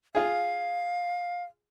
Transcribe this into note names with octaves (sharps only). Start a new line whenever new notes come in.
F4 G#4 F5